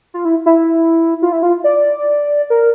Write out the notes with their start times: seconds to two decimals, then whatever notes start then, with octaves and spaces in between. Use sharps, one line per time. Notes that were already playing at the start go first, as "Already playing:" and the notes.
0.14 F4
0.25 E4
0.46 E4
1.22 F4
1.33 E4
1.43 F4
1.64 D5
2.50 A#4